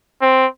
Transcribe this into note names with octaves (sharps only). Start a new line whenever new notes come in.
C4